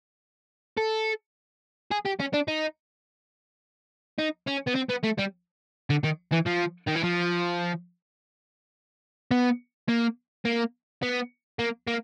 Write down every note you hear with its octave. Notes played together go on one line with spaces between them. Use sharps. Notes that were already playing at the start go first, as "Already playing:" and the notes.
A4
G#4
G4
C#4
D4
D#4
D#4
C#4
B3
C4
B3
A3
G3
D3
D#3
E3
F3
D#3
E3
F3
B3
A#3
A#3
B3
A#3
A#3